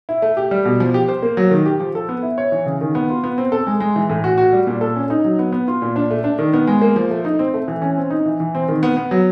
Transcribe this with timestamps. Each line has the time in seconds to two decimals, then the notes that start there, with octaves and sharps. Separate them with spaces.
0.09 E4
0.22 A3
0.37 G4
0.51 G3
0.65 B2
0.80 F3
0.94 G4
1.08 C5
1.23 A#3
1.37 F#3
1.51 D#3
1.66 G4
1.80 F3
1.95 A4
2.09 B3
2.23 E4
2.38 C#5
2.52 E3
2.66 C#3
2.81 D#3
2.95 B3
3.10 F4
3.24 B3
3.38 C4
3.52 A4
3.67 G#3
3.80 G#3
3.96 E3
4.10 A2
4.24 F#4
4.38 F#4
4.53 G3
4.67 A#2
4.81 A4
4.96 C#4
5.10 D#4
5.24 F#3
5.39 B3
5.52 B3
5.68 F4
5.82 A#2
5.96 D4
6.11 A3
6.24 D4
6.39 D#3
6.53 B3
6.67 G#3
6.82 A#3
6.96 F3
7.11 A3
7.25 D#4
7.39 C4
7.54 A3
7.68 E3
7.82 C#4
7.97 C4
8.10 D#4
8.25 E3
8.40 E3
8.55 C4
8.68 D#3
8.83 B3
8.97 B3
9.11 F#3